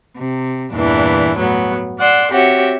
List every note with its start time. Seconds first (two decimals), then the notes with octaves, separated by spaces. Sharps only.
0.17 C3
0.71 E2 G2 A#2 E3 D4
1.36 A2 F#3 B3
1.98 D5 F#5 C6 E6
2.31 C4 F#4 G4 C#5 E5 F#5